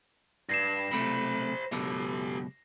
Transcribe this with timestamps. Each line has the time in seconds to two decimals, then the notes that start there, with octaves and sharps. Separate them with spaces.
0.49 G2 A#6 C7 E7
0.92 B1 C3 A3 C5 B5
1.72 C#2 F#2 B2 G4 A4